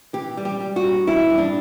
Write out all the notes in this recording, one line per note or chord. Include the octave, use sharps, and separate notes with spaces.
E3 G4
G3
G4
G3
F#4
G2
E3 E4
G2
D4